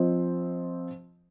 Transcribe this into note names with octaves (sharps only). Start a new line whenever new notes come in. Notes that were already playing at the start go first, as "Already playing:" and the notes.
Already playing: F3 C4 C5 D#5